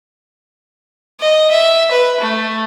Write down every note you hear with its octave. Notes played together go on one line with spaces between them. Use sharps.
D#5
E5
B4
A3